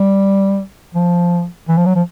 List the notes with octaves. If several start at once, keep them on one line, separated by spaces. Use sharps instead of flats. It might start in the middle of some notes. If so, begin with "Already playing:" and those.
Already playing: G3
F3
E3
F3
F#3
F3